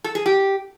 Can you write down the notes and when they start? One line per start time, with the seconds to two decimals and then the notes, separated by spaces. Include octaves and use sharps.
0.04 A4
0.15 G#4
0.26 G4